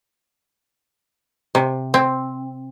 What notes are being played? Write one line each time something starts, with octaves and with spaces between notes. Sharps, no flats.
C3
C4